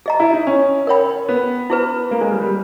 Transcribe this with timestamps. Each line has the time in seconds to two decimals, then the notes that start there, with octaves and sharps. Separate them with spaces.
0.06 G#4 D#5 A#5
0.20 E4
0.33 D#4
0.47 C#4
0.87 A#4 C#5 G5 B5
1.29 B3
1.70 E4 G#4 B4
2.11 A#3
2.21 G#3
2.31 G3
2.42 G3